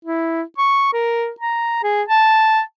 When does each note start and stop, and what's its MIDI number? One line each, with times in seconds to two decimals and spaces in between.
0.05 0.42 64
0.58 0.89 85
0.93 1.30 70
1.40 1.81 82
1.84 2.03 68
2.08 2.61 81